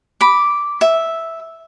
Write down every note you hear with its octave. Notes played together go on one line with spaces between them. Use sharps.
B5 D6
E5